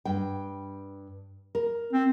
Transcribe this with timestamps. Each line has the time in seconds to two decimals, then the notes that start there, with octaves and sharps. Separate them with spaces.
0.05 G2 G5
1.55 A#4
1.93 C4